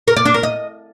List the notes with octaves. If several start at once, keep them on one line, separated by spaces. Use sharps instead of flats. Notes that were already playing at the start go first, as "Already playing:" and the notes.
A#4
D5
D4
A#4
D#5